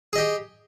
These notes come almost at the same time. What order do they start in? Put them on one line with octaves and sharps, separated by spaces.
G#4 D#5 G4